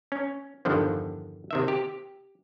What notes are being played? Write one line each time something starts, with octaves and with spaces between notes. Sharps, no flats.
C#4
E2 G2 D3 D#3 F3
C3 D#3 E5
G4